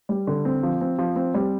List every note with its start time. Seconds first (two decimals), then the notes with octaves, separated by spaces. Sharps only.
0.09 G3
0.27 D3
0.45 C4
0.63 F3
0.81 C4
0.98 F3
1.16 C4
1.34 G3